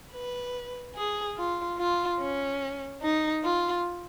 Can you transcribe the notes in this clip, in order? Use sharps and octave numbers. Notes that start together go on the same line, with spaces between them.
B4
G#4
F4
F4
C#4
D#4
F4